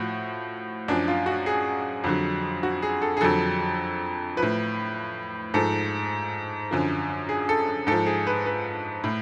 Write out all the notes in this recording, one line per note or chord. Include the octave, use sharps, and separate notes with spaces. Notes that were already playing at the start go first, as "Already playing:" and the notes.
Already playing: A2 F3 F#4
F#2 F3 D4
F4
F#4
G#4
F2 D3 F#3
F#4
G#4
A4
G#4
F2 D3 F#3 A4
F3 B4
A2
G#2 F3 A4
F#2 D3 F3
G#4
A4
G#2 F3 A4
G#4
B4
B4
A2